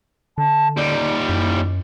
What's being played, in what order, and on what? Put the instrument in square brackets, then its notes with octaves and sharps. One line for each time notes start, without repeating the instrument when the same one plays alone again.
[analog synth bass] D3 [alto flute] A5
[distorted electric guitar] D#2 G3 [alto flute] D5
[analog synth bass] F#2 [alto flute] E4